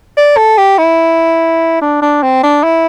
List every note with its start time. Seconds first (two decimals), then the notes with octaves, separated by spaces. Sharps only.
0.17 D5
0.37 A4
0.58 G4
0.78 E4
1.81 D4
2.02 D4
2.23 C4
2.43 D4
2.63 E4